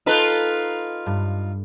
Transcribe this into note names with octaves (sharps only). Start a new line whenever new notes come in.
D#4 F4 A4 B4
G2